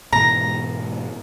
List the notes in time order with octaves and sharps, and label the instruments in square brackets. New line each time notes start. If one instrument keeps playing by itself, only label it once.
[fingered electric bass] G#2 B2 E3 [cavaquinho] A#5